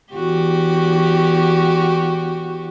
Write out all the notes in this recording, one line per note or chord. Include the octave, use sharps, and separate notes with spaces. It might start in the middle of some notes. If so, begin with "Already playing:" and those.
E2 F#4 G4